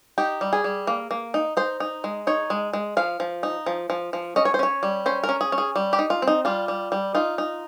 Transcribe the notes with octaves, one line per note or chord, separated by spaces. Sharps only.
D#4 G4
G3
G#4
G3
A#3
A#3
D#4
D#4 C5
D#4
G#3
D#4 C#5
G#3
G#3
F3 F5
F3
D#4
F3
F3
F3
C#4 D#5
C#5
C5
C#4 C#5
G3
C#4 C5
A#4
C#4
G#4
C#4
G#4
G3
G4
D#4
F4
C4
D#4
G3 F4
G3
G3
D#4 F4
D#4